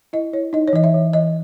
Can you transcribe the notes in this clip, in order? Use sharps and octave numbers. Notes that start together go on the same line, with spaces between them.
E4 D#5
E4 C#5
D#4 D#5
C#5
E3 D#5
E5
E3
E3 D#5